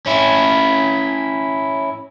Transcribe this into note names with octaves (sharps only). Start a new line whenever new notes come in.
C#4 E4